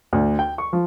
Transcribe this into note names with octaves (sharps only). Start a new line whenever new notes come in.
D2
G5
C#6
F3